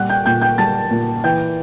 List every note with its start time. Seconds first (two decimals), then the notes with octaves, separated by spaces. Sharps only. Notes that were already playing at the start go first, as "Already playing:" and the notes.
Already playing: A#2 G3 F#5 F#6
0.09 G5 G6
0.25 A#2 G5 G6
0.42 G5 G6
0.58 G3 A5 A6
0.91 A#2
1.24 E3 G5 G6